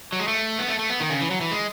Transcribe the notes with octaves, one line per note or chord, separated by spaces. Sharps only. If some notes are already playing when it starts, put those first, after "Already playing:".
F#3
G#3
A3
B3
A3
A3
B3
D#3
C#3
E3
F#3
E3
G#3